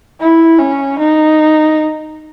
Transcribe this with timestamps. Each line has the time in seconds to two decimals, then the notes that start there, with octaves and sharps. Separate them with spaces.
0.20 E4
0.59 C#4
0.99 D#4